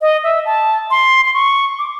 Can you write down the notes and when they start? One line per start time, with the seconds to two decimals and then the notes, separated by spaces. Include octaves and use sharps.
0.01 D#5
0.24 E5
0.46 A5
0.90 C6
1.25 C6
1.34 C#6
1.79 D6